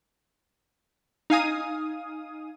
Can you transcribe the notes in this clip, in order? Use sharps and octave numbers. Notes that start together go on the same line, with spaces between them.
D#4 F5 G#5 D#6